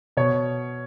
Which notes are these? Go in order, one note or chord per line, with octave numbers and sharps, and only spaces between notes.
B2 C#5